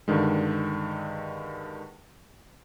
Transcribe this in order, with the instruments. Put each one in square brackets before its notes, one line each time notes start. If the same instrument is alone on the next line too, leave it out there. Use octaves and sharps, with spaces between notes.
[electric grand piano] G2 D3 D#3 G#3